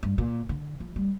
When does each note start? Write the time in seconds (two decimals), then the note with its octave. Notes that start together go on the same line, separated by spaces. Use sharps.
0.03 G2
0.18 A#2
0.49 D3
0.80 F3
0.96 G3